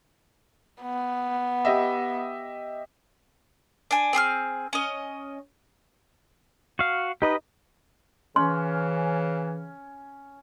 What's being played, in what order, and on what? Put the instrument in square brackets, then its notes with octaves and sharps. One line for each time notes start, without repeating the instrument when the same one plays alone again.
[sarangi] B3
[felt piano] G4 D#5 E5
[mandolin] D4 G#5
C4 G#4 D#6 F6
C#4 D#5
[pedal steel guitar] F#4 F5
[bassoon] D#4 [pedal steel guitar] G4 B4 D#5
[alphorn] C#3 [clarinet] E3 [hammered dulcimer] C#4 [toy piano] C6